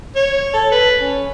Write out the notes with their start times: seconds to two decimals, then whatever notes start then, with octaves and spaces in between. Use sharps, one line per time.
0.15 C#5
0.53 A4
0.72 B4
1.00 C#4